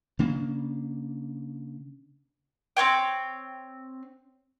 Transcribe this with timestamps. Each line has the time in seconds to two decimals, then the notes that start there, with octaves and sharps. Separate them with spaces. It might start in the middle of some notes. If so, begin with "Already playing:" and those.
0.19 C#3 A#3 D4
2.77 C4 C5 C#5 G5